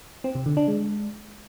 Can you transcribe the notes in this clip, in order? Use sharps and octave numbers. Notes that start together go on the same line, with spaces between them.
C4
C3
D3
D4
G#3